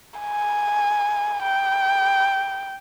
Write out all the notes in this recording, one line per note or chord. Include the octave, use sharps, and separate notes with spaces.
G#5
G5